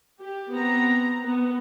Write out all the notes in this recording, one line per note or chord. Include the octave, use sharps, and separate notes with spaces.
G4
B3 C4 A#5
B3